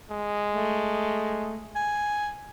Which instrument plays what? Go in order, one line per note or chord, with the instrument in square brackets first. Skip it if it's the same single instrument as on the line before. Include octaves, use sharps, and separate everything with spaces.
[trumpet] G#3
[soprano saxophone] A3
G#5